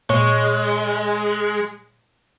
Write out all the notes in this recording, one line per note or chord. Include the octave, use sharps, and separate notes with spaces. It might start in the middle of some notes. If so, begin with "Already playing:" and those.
A#2 G#3 C#5 C#6